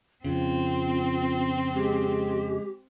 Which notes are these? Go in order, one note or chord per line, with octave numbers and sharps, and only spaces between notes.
F2 C#3 C4 F4
G#3 G4